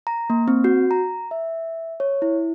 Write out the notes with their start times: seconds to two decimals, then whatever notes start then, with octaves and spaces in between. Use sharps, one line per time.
0.07 A#5
0.30 A#3
0.48 C4
0.64 F#4
0.91 A#5
1.31 E5
2.00 C#5
2.22 E4